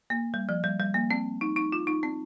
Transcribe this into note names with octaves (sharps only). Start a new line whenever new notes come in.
A#3
G3
F3
G3
G3
A#3
C4
D#4
D#4
F4
D#4
C4